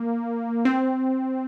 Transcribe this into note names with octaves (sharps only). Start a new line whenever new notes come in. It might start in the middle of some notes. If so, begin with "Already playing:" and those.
Already playing: A#3
C4